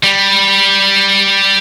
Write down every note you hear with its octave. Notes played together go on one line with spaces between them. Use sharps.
G3